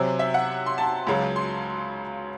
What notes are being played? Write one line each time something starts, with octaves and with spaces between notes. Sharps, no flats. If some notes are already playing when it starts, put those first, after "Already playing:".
Already playing: C3 F#3 C4 G#5
E5
F#5
C6
A5
C#2 C#3 F#3
C6